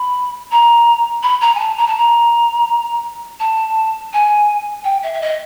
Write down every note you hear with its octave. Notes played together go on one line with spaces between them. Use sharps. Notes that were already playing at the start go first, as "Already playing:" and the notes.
Already playing: B5
A#5
B5
A#5
G#5
A5
A#5
A5
A#5
A5
G#5
G5
E5
E5
D#5